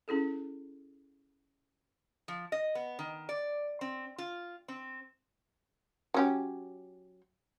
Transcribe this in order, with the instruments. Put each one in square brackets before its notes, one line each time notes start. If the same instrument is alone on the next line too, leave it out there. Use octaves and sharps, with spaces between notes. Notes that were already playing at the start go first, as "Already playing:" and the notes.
[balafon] C#4 E4 G#4 A4
[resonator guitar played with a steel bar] F3
D#5
B3
D#3
D5
C4
F4
C4
[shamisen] F#3 C#4 G4